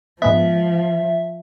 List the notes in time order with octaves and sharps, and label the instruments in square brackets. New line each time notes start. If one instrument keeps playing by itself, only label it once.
[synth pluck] G#2 G#3 B3 [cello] F3 [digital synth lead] E5